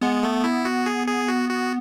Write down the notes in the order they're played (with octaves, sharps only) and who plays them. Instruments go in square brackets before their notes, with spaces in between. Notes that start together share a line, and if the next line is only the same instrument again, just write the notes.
[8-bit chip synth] G#3 [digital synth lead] B3
[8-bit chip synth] A3
E4
F#4
G#4
G#4
F#4
F#4